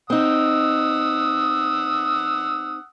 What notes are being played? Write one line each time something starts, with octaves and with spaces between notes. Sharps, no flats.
C4 D#4 F#5 D#6 E6